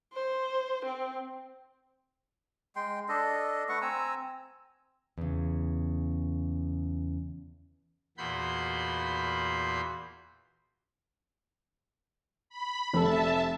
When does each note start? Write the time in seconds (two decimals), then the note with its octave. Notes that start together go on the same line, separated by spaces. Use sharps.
0.13 C5
0.84 C4
2.76 G#3 G5 C6
3.09 D4 A4 D#5
3.69 A3 B4 F#5 C#6
3.82 C4 G#5 A#5 E6
5.18 E2 C#3
8.18 E2 A#2 F#4 B5 C6 G6
12.50 B5
12.94 F1 C3 A4 E5 A5